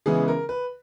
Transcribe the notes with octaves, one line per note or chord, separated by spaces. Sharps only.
C#3 E3 G#3 B3 G#4
A#4
B4